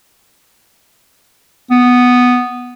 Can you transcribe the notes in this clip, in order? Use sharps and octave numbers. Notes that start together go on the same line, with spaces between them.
B3